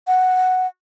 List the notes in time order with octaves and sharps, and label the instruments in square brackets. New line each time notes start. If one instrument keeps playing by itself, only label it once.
[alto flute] F#5